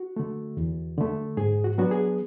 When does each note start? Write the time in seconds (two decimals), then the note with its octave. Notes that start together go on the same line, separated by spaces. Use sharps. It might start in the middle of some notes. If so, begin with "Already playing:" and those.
Already playing: F#4
0.16 D3 A3
0.57 E2
0.98 D3 A3
1.37 G#2 G#4
1.64 F#4
1.78 F#3 B3 D4 F#4
1.91 G#4